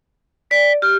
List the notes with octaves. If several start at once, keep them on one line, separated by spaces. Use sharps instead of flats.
D5 B6
G4 F6